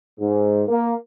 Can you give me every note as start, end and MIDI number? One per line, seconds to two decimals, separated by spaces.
0.20 0.63 44
0.68 0.92 58